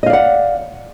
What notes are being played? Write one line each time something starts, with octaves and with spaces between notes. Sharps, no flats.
D5 D#5 F5 F#5